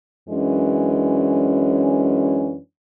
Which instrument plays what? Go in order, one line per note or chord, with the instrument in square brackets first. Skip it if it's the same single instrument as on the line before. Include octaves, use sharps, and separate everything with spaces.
[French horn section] F#2 E3 G#3 C#4 D4